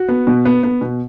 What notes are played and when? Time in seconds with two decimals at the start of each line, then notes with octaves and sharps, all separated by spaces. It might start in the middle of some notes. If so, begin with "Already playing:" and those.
Already playing: F#4
0.08 B3
0.27 B2
0.45 B3
0.63 B3
0.81 B2